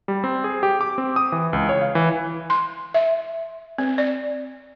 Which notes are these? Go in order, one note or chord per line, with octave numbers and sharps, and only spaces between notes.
G3
C4
G#4
G4
D6
C4
D#6
E3
C#2
C#5
F5
E3
C6
E5
C4
D5